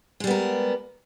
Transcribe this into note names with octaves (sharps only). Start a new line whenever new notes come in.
G3 G#3 B3 A#4